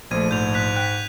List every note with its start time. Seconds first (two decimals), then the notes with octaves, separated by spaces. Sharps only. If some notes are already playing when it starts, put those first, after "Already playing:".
0.11 A#1 F3 A3 G#6 D#7
0.31 G#2 G6 F7
0.54 F#6 B6 F7
0.76 G5 F#6 B6